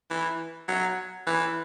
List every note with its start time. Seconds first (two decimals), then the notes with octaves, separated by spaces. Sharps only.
0.10 E3
0.68 F#3
1.27 E3